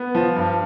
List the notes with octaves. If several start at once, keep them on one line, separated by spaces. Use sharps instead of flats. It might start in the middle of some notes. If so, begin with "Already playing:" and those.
Already playing: B3
F3
G2